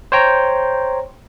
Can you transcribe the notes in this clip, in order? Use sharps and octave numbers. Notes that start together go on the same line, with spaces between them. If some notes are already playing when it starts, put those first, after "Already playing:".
C5 C#5 G5 A#5